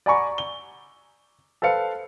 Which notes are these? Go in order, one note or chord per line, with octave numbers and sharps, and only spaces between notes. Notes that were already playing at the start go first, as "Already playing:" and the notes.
D5 F#5 G#5 A#5 B5 C#6
G7
A4 B4 C5 F5 C#7